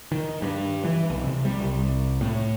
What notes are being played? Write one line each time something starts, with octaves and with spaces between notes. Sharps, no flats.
D#3
G2
E3
B1
C3
G3
C2
A2